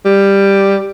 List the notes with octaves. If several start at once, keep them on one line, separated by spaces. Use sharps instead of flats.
G3